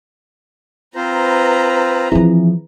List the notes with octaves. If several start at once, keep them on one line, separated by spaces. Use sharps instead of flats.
C4 F4 B4 C5 A#5
E3 F3 C4 E4 G#4